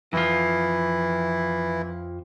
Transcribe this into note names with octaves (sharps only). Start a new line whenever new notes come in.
F2 E3 F3 E4